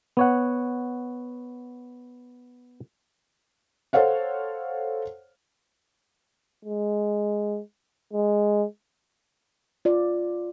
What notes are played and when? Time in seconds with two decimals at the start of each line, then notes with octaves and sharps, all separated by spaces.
0.17 B3 C#5 F#5
3.93 A4 C5 C#5 F5 F#5
6.65 G#3
8.13 G#3
9.85 F4 D5